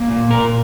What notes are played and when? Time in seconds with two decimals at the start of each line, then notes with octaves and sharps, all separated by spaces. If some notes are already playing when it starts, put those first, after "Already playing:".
Already playing: A#3
0.09 A#2
0.31 A#2 A#4